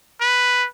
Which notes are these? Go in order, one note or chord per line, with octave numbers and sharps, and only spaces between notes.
B4